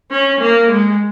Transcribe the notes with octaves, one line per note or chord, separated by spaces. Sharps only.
C#4
A#3
G#3